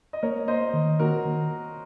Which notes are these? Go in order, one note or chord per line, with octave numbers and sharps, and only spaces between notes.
D#5
A#3 A#4 C#5
A#3 C5 D#5
D#3
A#3 F#4 A#4
D#3